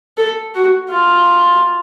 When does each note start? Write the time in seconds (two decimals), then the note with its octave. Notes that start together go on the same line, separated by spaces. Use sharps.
0.18 A4
0.55 F#4
0.91 F4